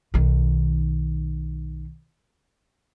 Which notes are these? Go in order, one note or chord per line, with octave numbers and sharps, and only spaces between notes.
B1 D#3